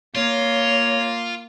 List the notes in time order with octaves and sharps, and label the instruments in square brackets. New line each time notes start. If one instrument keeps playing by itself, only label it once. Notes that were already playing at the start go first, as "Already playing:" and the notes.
[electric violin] A#3 [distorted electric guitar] F4 [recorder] C#5